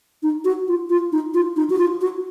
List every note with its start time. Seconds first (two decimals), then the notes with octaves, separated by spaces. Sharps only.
0.23 D#4
0.45 F#4
0.68 F4
0.90 F4
1.12 D#4
1.34 F4
1.56 D#4
1.70 F#4
1.78 F4
2.01 F#4